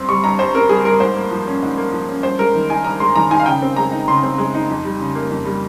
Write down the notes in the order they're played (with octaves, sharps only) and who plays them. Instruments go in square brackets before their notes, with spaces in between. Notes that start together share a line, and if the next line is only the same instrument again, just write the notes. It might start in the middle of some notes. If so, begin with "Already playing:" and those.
Already playing: [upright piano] G2 C4 C6
G3 C#6
G2 A#5
G2 C5
C4 A#4
G3 G#4
G2 A#4
G#2 C5
A#3
F3
C#4
G#2
A#3
F3
C#4
G2 C5
G#3 A#4
D#3
D#4 G#5
G2 A#5
G#3 C6
D#3 A#5
D#4 G#5
F5
C#3 G5
C4
G#3 A#5
D#4
C#3 C6
C4
G#3
D#4
F2
G3
C#3
A#3
F2
G3